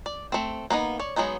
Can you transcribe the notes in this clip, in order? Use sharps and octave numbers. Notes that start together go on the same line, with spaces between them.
D5
A3 C4
A#3 B3 C#4 D#4
C#5 D5
F#3 G#3 B3 D#4